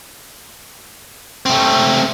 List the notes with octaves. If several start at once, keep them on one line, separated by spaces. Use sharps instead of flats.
A3 C4